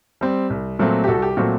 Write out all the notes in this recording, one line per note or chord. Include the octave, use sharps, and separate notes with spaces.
G3 C4
C2
A#2 F#3 A3 C4
G4
C2 F#4 A4
G4
A#2 F#3 A3 C4 F#4